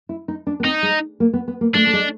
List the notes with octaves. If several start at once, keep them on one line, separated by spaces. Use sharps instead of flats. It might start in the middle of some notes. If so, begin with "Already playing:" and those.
E4
D#4
D4
B3
C4 D#4
G#3
A#3
B3
B3
A#3
A3 D4
A3
G#3